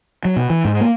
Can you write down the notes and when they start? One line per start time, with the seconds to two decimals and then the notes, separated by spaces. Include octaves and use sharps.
0.25 F#3
0.36 B2
0.50 E3
0.65 G#2
0.81 A#3